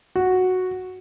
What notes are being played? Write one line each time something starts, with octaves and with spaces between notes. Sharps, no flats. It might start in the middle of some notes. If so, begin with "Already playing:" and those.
F#4